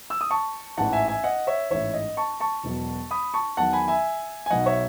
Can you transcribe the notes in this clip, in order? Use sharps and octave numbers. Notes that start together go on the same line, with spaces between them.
E6
D#6
A5 C#6
A1 G#2 E3 F#5 A5
E5 G#5
E5 G#5
D#5 F#5
C#5 E5
A1 G#2 E3 C#5 E5
D#5
A5 C#6
A5 C#6
E1 E2 B2 F#3
B5 D#6
A5 C#6
E2 D#3 F#3 F#5 A5
G#5 B5
E5 G#5
G#5
B1 B2 F#3 D#5 F#5
C#5 E5